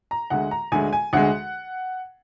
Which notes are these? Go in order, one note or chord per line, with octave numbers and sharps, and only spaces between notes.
A#5
D2 D3 G#3 F#5
A#5
D2 D3 G#3 G#5
G#5
D2 D3 G#3 F#5